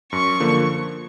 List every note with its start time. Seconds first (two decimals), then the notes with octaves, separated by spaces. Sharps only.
0.13 F#2 C#6
0.40 D3 F3 A#3